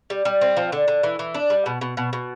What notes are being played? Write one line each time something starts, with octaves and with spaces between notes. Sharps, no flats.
G3
G3
C4
F3
D3
D3
E3
E3
D4
G3
B2
B2
B2
B2